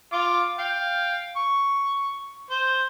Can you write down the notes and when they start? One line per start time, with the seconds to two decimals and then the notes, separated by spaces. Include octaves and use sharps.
0.13 F4 D6
0.59 F5 G5
1.37 C#6
2.50 C5